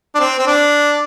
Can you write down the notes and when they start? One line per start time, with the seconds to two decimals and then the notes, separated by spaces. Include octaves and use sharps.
0.15 D4
0.20 C4
0.39 C4
0.47 D4